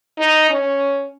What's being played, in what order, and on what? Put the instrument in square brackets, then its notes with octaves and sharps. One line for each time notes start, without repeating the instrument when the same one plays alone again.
[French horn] D#4
C#4